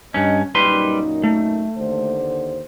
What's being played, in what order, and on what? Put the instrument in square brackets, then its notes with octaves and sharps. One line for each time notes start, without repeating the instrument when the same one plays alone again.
[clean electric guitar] G2 C#4 [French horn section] D#5
[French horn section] F#2 A#2 D#4 [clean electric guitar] G3 B4 C6
[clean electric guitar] A3
[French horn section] D#2 D3 C5